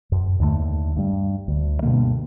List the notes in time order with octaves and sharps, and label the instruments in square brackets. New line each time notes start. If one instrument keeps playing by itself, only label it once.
[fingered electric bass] F#2
D#2 D3 F3 A3
G2 G3
D2
G2 B2 D3 A#3